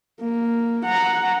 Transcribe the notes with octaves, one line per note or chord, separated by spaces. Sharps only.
A#3
F#5 A#5